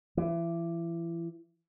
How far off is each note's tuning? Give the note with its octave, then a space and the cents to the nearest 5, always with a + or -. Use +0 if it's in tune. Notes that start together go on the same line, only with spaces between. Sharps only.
E3 +30